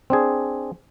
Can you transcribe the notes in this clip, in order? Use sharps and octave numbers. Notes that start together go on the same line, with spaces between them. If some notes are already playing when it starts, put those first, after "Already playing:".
C4 D4 G#4